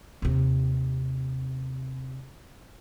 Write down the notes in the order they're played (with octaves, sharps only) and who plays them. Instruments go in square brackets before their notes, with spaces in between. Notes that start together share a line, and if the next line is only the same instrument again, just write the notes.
[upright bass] D#2 C3